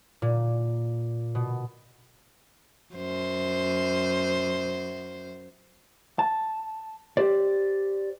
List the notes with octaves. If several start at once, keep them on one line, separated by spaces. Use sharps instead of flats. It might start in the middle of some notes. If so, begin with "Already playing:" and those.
A#2
B2
F#2 C5
A5
G4 C5 D5